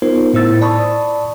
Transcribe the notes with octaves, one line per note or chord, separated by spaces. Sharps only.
B3 D#4 F4 A#4 C5
A2 E4 C5 E6 A6
D5 A5 B5 C#6 D#6